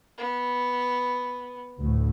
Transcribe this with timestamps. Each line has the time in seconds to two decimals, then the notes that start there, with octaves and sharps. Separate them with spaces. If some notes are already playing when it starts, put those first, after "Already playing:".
0.18 B3
1.80 D2 A2